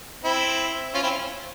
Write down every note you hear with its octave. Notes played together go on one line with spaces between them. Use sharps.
C4 E4
C#4 F4
C4 E4